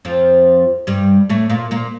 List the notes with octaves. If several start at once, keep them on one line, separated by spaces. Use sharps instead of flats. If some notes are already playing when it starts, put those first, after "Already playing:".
F2 F3
G2 G3
A2 A3
A#2 A#3
A#2 A#3